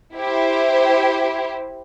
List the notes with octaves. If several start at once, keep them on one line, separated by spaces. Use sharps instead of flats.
E4 G4 C5